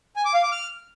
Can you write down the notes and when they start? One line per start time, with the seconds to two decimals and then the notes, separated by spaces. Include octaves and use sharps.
0.16 G#5
0.25 D6
0.34 F5
0.43 D6
0.51 F6